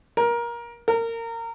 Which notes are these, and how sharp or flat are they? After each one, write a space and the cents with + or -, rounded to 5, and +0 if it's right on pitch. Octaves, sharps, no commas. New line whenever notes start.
A#4 +20
A#4 -25